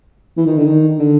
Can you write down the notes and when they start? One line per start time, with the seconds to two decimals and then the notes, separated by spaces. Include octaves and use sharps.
0.37 E3
0.46 D#3
0.57 D3
0.66 D#3
0.98 D3